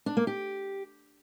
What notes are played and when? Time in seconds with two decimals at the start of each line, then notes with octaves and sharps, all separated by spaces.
0.06 D4
0.17 A#3
0.27 G4